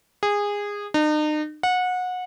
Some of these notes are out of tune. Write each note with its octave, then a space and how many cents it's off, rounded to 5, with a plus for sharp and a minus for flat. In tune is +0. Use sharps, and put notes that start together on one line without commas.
G#4 -20
D#4 -40
F#5 -25